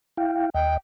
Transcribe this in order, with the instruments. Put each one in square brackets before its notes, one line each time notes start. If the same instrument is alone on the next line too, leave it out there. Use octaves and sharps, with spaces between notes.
[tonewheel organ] E4 F5 G5
[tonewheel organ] D#2 D#5 [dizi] G5